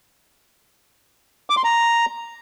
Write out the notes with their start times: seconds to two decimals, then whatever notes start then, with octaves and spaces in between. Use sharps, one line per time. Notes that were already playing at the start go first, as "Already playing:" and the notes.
1.50 D6
1.57 C6
1.64 A#5